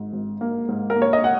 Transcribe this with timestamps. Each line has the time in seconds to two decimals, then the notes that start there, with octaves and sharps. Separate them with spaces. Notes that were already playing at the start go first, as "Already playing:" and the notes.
Already playing: G#1 G#2
0.13 G#1
0.41 A#3
0.69 G#2
0.90 A#4
0.96 A#3
1.02 C#5
1.13 D#5
1.24 F#5